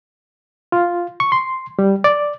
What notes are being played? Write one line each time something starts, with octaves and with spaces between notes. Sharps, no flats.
F4
C#6
C6
G3
D5